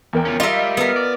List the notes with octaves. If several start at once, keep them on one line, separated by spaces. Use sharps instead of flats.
E2 A#4 G5
C#4 F4
G3 F4 A#4 D#5 E5
B3 A#4
D5